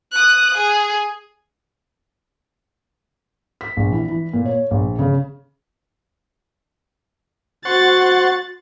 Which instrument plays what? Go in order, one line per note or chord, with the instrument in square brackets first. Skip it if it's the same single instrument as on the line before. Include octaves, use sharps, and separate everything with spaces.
[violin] D#6 F#6
G#4
[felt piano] B6
A#1
E3
E3
A#2
C#5
A#1
C#3
[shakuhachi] F#4 [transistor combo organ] C5 F#5 C#6 [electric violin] A6